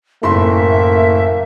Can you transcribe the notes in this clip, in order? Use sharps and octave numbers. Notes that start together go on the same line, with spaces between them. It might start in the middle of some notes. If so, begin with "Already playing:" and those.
F#1 A2 A#3 E5 C6